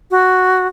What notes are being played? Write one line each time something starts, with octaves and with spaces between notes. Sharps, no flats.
F#4